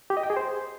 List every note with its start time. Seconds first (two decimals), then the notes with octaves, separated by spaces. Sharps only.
0.10 G4
0.17 D#5
0.23 G5
0.30 G#4
0.37 C5